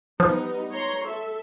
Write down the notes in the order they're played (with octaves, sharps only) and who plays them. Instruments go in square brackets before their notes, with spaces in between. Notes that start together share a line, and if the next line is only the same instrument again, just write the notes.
[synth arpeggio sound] F3 [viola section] G3 B3 D#4
[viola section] C#5 A#5 C6
A4 E5